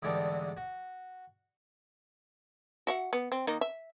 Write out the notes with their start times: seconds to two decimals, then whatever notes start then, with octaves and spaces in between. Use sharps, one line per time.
0.02 E2 G#2 D3 G3 C4 D4
0.57 F#4
2.87 F#4 E5 F#5
3.13 B3
3.32 C4
3.47 D#3 A#3 D#4
3.61 E5